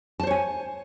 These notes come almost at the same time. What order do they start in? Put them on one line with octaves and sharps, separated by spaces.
A5 C5 C#5 G#5